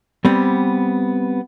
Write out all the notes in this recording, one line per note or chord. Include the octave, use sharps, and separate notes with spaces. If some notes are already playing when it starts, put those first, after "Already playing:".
G3 B3 C4